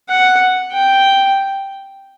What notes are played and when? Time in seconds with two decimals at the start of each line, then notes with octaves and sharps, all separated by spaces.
0.09 F#5
0.72 G5